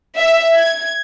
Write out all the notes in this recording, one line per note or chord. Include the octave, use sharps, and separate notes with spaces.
E5
G#6